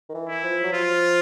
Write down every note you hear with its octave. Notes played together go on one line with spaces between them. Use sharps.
D#3
E3
E4
F3
F#3
F3 F4